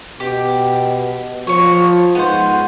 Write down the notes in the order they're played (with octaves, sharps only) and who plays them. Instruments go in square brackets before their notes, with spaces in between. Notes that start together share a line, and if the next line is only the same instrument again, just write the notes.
[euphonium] B2 [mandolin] G4
[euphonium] F3 [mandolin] C#5 C#6
[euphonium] G#2 [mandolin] B3 C5